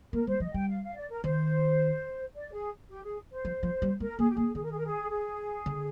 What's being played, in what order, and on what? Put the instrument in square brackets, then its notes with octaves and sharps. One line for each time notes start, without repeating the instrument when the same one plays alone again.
[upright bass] A#3 [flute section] A#4
[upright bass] G3 [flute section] C5
[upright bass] F3 [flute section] D#5
[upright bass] G3 [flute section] G5
[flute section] F5
F5
D5
A#4
[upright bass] D#3 [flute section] C5
[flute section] D5
G#4
G4
G#4
C5
[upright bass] F3
F3
G3
[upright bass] G#3 [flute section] A#4
[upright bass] A#3 [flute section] G#4
[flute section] G4
[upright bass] A#3 [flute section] G#4
[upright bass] D#3 [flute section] G#4
[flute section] A#4
G#4
A#4
G#4
G#4
[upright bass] D3